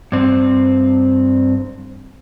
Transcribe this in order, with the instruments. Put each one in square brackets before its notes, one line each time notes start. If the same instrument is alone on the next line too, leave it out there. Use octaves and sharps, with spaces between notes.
[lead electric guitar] G2 C4